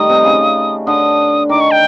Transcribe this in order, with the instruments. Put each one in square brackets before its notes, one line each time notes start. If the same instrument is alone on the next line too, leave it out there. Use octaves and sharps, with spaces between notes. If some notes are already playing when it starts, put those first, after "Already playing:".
Already playing: [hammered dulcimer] D#3 G3 A3 [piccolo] D#6
[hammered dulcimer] C3
C#3
[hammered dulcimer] D3 [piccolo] D#6
[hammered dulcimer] D#3 [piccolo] D6
[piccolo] C#6
G5